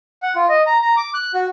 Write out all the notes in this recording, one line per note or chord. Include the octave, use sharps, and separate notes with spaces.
F#5
F4
D#5
A#5
A#5
D6
F#6
F#4